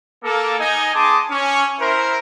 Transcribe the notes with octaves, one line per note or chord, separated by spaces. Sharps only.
A#3 A4
D#4 D#5 G#5
B3 G#4 A5 C6 D6 D#6
C#4
E4 A#4 C5